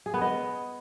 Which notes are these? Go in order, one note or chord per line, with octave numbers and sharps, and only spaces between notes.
G#4
B3
D#5